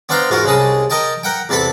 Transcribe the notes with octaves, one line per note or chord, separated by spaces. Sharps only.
B3 D4 C5 F5 G5 A#5
G#2 F4 F#4 A#4
C2 C#3 G#3 A5 D#6
A#4 D#5 G5 A5
A#4 F#5 G5
E2 C3 A4 A5 B5